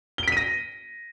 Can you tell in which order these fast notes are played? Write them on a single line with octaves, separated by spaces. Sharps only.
G7 D7 B6 D#7 A#6